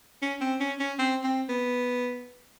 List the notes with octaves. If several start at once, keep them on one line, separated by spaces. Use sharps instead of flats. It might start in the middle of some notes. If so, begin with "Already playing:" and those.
C#4
C4
C#4
C#4
C4
C4
B3